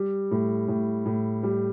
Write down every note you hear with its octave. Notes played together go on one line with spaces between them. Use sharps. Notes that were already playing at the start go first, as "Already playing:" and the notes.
Already playing: G3
A2
A2
A2
G3